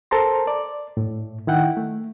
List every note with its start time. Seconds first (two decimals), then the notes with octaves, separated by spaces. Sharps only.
0.11 A4 A#4 C5 A5 A#5 C6
0.47 D5
0.97 A2
1.47 D#3 E4 F#5 G5
1.77 A3